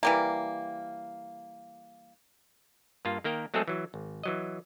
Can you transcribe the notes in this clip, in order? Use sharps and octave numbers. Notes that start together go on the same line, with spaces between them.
E3 G3 A#3
G2 A#3 F4
D#3 A#3 A#4 G5
F#3 G#3 A3 C4 G#4 A4
E3 F#3
G#1
E3 F#3 D#5